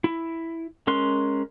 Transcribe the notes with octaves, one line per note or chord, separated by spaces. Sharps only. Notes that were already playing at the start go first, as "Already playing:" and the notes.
E4
G#3 C#4 A#4 C6 F#6